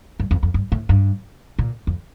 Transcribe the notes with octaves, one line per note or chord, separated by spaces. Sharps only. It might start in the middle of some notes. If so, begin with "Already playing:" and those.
G2
F2
F2
G2
A2
G2
A#2
F2